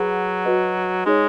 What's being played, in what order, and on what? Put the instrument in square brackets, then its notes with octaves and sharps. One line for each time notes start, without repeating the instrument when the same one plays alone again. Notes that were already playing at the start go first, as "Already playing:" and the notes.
Already playing: [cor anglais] F#3 [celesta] G#4 B4 F#5 B5
[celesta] F#4 B4 D#5
[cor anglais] G#3 [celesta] D#4 G#4 C#5